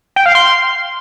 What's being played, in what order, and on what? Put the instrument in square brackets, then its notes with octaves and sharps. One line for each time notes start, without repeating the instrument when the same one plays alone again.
[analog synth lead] G5
F5
C6